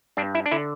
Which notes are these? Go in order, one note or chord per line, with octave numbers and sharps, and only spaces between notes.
G2 D4
E4
D4
D3 E4